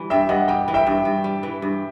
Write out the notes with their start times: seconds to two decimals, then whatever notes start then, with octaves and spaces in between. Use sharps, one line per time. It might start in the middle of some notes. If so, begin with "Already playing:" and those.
Already playing: E3 G3
0.10 G2 E5 G5
0.29 G2 D#5 F#5
0.48 G3 G5
0.68 E3
0.74 E5 G5
0.86 G2
1.05 G2
1.24 G3
1.43 E3
1.62 G2